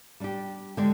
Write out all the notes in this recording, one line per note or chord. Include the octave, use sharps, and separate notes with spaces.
G3 D4 G4
D3 G#3 D4 G4 D5